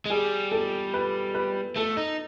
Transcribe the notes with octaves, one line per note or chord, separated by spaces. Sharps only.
G#3
G3 G#4
A4
B4
B4
A3 A4
D#4